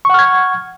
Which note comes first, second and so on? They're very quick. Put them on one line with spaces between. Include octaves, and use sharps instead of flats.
C#6 F#5 F6 G#6